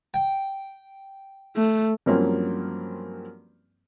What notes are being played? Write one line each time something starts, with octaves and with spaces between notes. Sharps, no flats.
G5
A3
G2 F3 F#3 A#3 C4 C#4